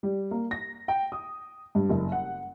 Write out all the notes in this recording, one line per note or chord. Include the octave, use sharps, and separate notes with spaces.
G3
A#3
A#6
G5
D#6
G2
F#1
F#5